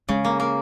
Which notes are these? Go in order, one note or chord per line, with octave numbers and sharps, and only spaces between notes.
C#3 G#3
A#3
A#3